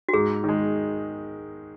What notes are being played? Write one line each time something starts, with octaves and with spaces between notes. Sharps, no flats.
F#4
G#2 G#4
D#3 G#3